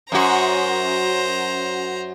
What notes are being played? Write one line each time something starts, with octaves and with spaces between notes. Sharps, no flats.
F#2 F#4 C5 A#5